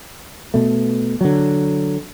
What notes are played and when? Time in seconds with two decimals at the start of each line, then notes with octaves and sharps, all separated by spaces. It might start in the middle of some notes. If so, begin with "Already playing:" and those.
0.54 B2 A3
1.21 D3 F#3